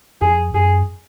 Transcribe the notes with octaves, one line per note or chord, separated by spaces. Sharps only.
F2 G#4
F#2 G#4